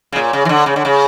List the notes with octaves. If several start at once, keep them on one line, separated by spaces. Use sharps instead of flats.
C#3
A#2
C#3
E3
D3
C#3
D3
C#3